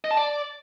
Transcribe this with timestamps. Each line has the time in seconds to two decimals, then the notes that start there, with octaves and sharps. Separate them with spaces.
0.04 D#5
0.11 A5
0.17 D5